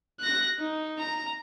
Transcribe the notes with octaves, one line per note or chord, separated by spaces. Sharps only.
F#6 A#6
D#4
A#5